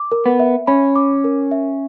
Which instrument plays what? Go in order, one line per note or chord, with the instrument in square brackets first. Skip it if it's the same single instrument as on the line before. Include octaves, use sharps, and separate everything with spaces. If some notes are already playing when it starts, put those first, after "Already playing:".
Already playing: [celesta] D6
A#4
[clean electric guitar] B3
[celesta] E5
[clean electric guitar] C#4 [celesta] B5
[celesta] D6
A#4
E5